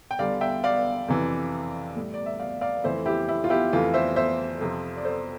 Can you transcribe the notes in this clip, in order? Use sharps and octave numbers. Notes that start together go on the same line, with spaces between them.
G5
E2 D3 G3 D5 F5
E5 G5
D5 F5
F2 C3 E3
A2 G3
D5
E5
D5 F5
D5 F5
F2 E3 A3 C5 E5
E4 G4
E4
F4
E4 G4
F2 E3 A3 F4
C5 E5
C5 E5
F2 C3 F3
D5
A4 C5